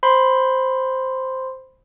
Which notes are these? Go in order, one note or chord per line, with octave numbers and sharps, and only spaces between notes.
C5 B5 C6